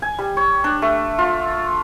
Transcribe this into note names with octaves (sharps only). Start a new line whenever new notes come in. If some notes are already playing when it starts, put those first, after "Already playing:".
G#5
G3
C#5
D4
A3
F4